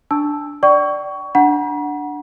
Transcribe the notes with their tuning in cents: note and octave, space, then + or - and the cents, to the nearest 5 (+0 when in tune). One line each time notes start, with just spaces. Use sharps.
D4 +0 A5 +0 E6 +0
D5 +0 G5 -40 C#6 +20
D4 +0 F#5 +0 A#5 +45